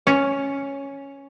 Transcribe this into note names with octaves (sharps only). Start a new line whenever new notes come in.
C#4